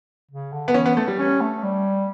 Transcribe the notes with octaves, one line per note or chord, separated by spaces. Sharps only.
C#3
D3
B3
E3 C#4
B3
A3
G3
C#4
A3
G3